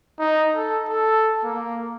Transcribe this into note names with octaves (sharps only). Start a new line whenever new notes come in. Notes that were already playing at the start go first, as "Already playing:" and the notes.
D#4
A4
A4
A#3